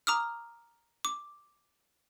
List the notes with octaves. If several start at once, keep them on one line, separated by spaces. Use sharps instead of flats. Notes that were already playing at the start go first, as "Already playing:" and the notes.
A#5 D6 D#6 F6
D6